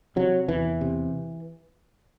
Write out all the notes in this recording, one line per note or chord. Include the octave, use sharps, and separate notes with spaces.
C3 F#3
E2 E3
C3